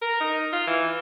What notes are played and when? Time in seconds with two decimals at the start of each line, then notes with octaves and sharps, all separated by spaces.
0.01 A#4
0.20 D#4
0.52 F4
0.67 E3